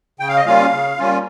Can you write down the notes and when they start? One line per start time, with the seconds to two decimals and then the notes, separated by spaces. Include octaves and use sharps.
0.20 C#3 G5
0.29 F5
0.37 D#5
0.45 G3 A#3 C#4 F4 F5
0.72 C#3
0.98 G3 A#3 C#4 F4